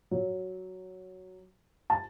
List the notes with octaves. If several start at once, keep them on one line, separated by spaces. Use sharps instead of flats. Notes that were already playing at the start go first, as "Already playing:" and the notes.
F#3
A5